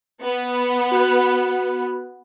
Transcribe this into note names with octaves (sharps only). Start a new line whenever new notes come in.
B3
F#4 B5 F#6